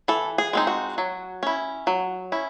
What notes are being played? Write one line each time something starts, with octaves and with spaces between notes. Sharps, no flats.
E3 A4
G#4
G#3 C4 D#4
F#4
F#3
C#4 E4
F#3
C#4 E4